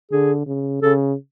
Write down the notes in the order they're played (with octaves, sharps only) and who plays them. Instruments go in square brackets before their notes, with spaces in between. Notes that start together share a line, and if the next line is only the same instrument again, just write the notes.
[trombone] D3 [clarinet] G#4
[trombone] C#3
[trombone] C#3 [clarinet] A4